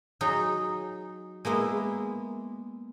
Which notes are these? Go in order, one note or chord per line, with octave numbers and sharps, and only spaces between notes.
F#3 D#4 G#4
G#3 A#3 B3 E4